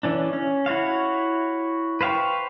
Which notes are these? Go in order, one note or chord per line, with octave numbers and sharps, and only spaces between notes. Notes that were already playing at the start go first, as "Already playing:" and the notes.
E3 C#4 D4
C#4
E4 F#4 C#5 F5
B4 C5 F5 G5 C#6